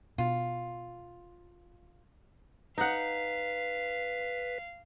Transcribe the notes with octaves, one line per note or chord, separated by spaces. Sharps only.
B2 F4
D#4 B4 F5 F#5 B6